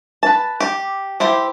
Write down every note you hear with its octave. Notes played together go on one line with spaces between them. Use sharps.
B4 A5
G4
E4 G4 C5